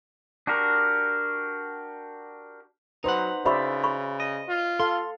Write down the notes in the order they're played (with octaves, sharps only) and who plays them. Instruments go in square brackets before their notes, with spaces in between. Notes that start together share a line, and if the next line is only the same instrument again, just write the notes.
[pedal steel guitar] D4 F#4 G4 A#4
[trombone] F#3 [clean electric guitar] D#4 F#5 [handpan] B4 C5
[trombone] C#3 [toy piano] F#4 B5 C#6 [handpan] C5 D5 E5
[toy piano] B5 C#6
[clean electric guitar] D#5
[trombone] F4
[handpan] A4 F5 [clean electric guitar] C6